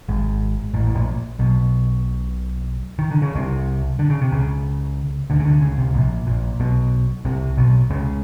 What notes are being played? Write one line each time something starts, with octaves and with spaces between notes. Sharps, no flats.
G#1 G#2
A1 A2
A2
A#1 A#2
B1 B2
D#3
D3
C#3
C2 C3
D3
C#3
C3
C#2 C#3
D2 D3
C#3
D2 D3
C#2 C#3
C2 C3
A#1 A#2
A#1 A#2
B1 B2
C2 C3
B1 B2
C#2 C#3